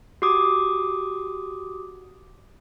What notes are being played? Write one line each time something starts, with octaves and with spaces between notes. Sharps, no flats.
F#4 G4 D6 D#6